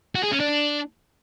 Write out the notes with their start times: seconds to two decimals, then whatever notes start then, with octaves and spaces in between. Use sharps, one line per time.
0.15 F#4
0.24 G#4
0.32 C#4
0.40 D4